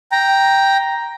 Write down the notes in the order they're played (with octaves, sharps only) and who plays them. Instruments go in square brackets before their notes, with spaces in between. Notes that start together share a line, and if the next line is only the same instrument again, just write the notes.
[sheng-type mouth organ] G5 A#5